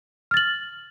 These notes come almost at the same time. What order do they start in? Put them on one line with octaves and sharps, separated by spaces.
F6 A6 F#7